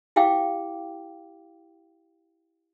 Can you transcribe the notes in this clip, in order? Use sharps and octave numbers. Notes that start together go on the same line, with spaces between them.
E4 G4 F5 G5 D6